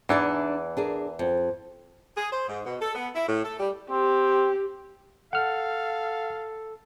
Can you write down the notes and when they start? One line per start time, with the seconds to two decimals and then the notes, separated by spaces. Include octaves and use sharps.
0.09 E2 E3 D4 D#4 D5
0.77 D4 G#4 A#4
1.19 F2
2.17 G#4
2.32 C5
2.49 G#2
2.66 B2
2.81 A4
2.95 B3
3.15 E4
3.28 A2
3.44 A4
3.60 G3
3.91 C4 G4
5.33 A4 F5 F#5 F6